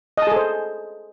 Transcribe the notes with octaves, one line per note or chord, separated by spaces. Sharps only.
G#4 A4 C5 D#5 A5